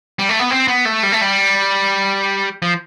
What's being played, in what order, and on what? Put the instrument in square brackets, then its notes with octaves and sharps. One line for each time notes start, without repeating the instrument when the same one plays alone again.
[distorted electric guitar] G3
A3
B3
C4
B3
A3
G3
A3
G3
F3